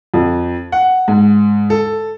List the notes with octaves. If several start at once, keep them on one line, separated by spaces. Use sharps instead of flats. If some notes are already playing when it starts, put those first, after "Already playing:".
F2
F#5
G#2
A4